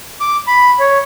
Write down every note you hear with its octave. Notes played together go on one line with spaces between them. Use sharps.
D6
B5
C#5